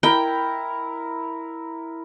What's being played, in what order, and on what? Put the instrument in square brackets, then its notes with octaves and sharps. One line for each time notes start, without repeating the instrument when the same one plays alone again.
[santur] E4 A#4 [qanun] G5